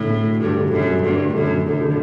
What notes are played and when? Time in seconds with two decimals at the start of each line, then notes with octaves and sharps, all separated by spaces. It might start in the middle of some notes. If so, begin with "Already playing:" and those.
Already playing: A2 D3 A3
0.10 A3
0.25 F#3
0.41 G2 D3
0.56 D3
0.72 F#2 D3
0.88 F#3
1.03 G2 A3
1.18 D3
1.35 F#2 D3
1.50 D3
1.66 F#2 D3
1.82 D3